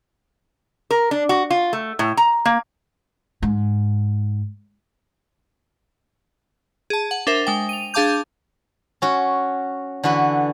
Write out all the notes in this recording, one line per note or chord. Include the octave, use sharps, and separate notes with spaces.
A#4
D4
F#4
F4
A3
A2
A#5
A#3
G#2
G#4 A5
F#5
D4 A#4 C5 E5
G#3 G5
D#7 F7
D4 G#4 F5 A5 D6 G6
C#4 F#4
D3 E3 F#4 B4